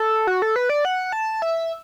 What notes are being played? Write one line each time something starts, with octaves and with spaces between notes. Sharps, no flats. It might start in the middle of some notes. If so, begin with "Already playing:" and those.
Already playing: A4
F#4
A4
B4
D5
F#5
A5
E5